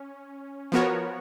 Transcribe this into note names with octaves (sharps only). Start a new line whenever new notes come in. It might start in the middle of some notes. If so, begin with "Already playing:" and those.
Already playing: C#4
F3 B3 F#4 A#4 C#5